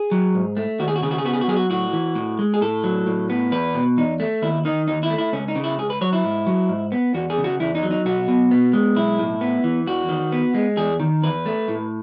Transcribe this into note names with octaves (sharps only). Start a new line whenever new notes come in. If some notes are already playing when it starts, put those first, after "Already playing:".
Already playing: G#4
F#3
G#2
A3
D#2 F#4
G#4
F#4
C#3 G#4
F#4
G#4
B3 F#4
G#4
F#4
F#3 G#4
F#4
A2 F#4
E3
A2
G#3
G#4
A2 A4
F#3
A2
B3
E2 B4
B2
E2 D#4
A3
D#2 E4
D#3 D#4
D#2 D#4
E4
A3
E4
C#2 C#4
D#4
C#3
E4
C#2 G#4
B4
F#3 C#5
E4
G#2
F#3
G#2
B3
E2 F#4
G#4
C#3
F#4
E2 E4
D#4
F#3
D#4
B1 F#4
B2
B3
G#3
B1 E4
A2
B3
E3
E2 F#4
D#3
B3
G#3
E2 G#4
D#3
E2 B4
A3
A2